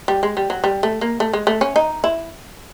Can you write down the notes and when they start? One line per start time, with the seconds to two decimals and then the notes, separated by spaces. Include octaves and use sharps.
0.08 G3
0.23 G#3
0.37 G3
0.50 F#3
0.64 G3
0.83 A3
1.01 A#3
1.20 A3
1.33 G#3
1.47 A3
1.61 C#4
1.76 D#4
2.04 E4